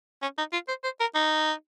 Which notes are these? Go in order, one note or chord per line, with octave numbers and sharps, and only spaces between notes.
C#4
D#4
F4
C5
C5
A#4
D#4